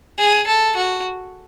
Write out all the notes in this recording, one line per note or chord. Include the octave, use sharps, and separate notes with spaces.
G#4
A4
F#4